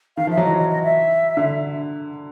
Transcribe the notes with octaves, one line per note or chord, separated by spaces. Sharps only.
D#3 F5
F3
E5
F#3
E3 D#5
D#5
D#5
E5
D3